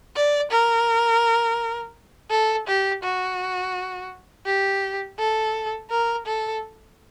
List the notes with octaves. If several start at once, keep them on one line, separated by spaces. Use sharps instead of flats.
D5
A#4
A4
G4
F#4
G4
A4
A#4
A4